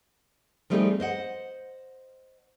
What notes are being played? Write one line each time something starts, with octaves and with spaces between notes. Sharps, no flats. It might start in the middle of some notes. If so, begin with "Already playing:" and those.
F3 G3 A3 C4 D#4 G#4
C5 D#5 F#5